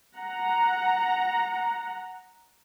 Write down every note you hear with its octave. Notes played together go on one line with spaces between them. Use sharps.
F#5 A#5